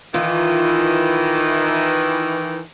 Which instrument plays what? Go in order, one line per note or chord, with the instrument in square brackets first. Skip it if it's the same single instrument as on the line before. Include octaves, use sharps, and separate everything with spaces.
[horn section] D#3 E3 [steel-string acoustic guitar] F4